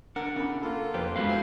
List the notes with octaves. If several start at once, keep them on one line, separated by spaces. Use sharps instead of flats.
D4 A#4 F#5
C#3 B5
A#3 F4 A4
F2 G4 A4 B4 C5
G2 G#3 F#4 F5
E4 C5 C6